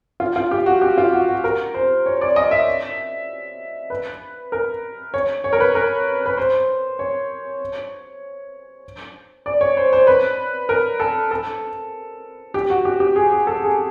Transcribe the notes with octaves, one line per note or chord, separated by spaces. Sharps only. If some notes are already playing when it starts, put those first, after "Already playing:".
F4
F4
G4
F#4
G4
F4
F#4
F#4
A#4
C5
C#5
D5
D#5
E5
B4
A#4
C#5
C#5
A#4
B4
A#4
B4
C5
C#5
D5
C#5
C5
C5
B4
A#4
A4
A4
G4
F#4
G4
G4
G#4
G#4
A4
G#4